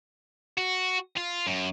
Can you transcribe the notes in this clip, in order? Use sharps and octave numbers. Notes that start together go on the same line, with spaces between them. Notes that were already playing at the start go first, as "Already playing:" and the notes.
F#4
F4
F#2